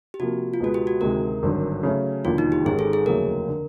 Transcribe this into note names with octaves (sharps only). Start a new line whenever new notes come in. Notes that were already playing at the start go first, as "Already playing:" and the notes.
G4
C3 F3 A#3 F#4
F4
C#2 B2 G#3 B3 F#4
G4
F#4
D2 C3 D#3 G#3 A#4
G#1 G2 D3 F#3
C#3 F#3 A3 C#4
E1 D#2 D3 F#3 F4
D#4
G4
G#1 G#2 D#3 G#3 C#4 G#4
A4
G#4
F1 D#2 C#3 F#3 A3 A#4
D3